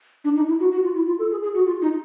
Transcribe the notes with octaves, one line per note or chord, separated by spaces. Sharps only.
D4
D#4
E4
F#4
F#4
F4
E4
F4
A4
G#4
G#4
F#4
F4
D#4